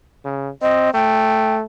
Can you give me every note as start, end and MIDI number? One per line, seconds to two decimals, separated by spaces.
0.25 0.49 49
0.62 0.89 60
0.62 0.90 75
0.94 1.63 57
0.94 1.55 79